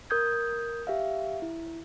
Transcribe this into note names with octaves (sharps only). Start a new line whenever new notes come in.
A#4 D#6 G6 G#6
G4 E5 F5
E4